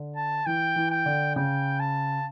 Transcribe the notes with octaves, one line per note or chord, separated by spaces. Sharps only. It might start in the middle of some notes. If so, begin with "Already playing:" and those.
Already playing: D3
A5
E3 G5
E3
G5
D3
C#3 G5
A5